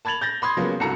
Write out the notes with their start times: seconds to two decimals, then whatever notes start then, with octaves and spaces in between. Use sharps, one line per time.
0.05 A5 B5 G#6 A6 F7 F#7
0.21 G6 A6 A#6
0.42 B5 C6 D#6 G#6
0.57 C#3 F3 F#3 G#3 A#3 B3
0.80 C2 G2 F#4 A4 A#5 C#7